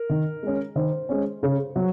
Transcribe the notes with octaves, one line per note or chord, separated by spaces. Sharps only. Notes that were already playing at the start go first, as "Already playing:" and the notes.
Already playing: A#4
D#3
G#3 C#4
D#3 C5
G#3 C#4
C#3
F#3